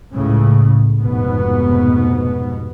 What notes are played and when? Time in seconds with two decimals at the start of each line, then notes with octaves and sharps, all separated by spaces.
0.14 C#2 A2 C#3
1.01 F1 G#2 B2 B3